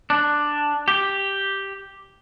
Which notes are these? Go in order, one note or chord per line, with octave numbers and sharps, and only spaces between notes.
D4
G4